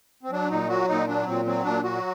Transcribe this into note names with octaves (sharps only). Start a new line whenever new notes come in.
C4
F#3 D4
A#2 D#4
F#3 F#4
A#2 D#4
F#3 D4
A#2 C4
F#3 C4
A#2 D4
F#3 F#4